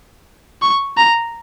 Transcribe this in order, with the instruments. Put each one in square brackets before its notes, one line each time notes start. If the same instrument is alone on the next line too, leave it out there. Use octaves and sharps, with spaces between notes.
[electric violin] C#6
A#5